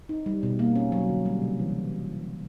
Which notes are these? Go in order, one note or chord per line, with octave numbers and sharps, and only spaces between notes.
D#4
G3
B2
A#3
C#4
F#3
D3
G3
C3
E3